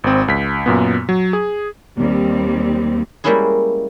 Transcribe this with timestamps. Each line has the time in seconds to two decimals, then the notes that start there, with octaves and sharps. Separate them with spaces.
0.04 G#1 C4
0.28 C#2 B6
0.66 F#2 A#2 B3
1.09 F#3
1.33 G#4
1.98 D#2 G3 C4
3.24 G3 G#3 A#3 C#4 E4 G#4